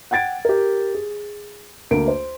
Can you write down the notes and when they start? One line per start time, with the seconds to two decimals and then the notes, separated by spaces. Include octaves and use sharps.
0.11 F#5 G5 G#6 A6 D7
0.45 G4 A#4
0.94 G#4
1.91 D2 A#3 D7
2.08 C5